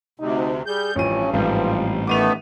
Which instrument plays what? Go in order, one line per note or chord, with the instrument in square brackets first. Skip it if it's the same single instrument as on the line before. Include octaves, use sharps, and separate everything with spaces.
[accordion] D2 C3 [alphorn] D#4
[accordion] G3 G6 [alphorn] G#4
[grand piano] A1 F3 D#7 [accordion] G2 [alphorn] C#4
[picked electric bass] A1 [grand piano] G#2 G3 C4 [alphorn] F3
[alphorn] D#3 [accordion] A3 B3 [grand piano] D6 D#7 F7